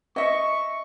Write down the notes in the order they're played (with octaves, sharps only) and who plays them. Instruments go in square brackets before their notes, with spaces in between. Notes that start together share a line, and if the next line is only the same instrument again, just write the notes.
[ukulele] D#5 E5 [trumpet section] C#6